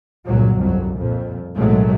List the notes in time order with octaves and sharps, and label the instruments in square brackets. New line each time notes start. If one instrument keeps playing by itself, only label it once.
[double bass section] G1 C#2 A#2 F#3
C2 F2 F#3
F2 A#2
B1 A2 D#3 F#3 G#3 A3